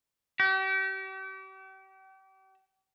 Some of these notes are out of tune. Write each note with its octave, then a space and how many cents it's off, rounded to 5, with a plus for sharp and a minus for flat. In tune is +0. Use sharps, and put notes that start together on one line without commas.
G4 -40